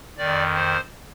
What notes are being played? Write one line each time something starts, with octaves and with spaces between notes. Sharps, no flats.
F2 D#3 D5
C5